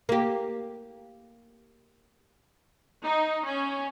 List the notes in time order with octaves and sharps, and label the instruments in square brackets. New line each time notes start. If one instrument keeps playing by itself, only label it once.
[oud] A#3 G4
[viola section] D#4
C#4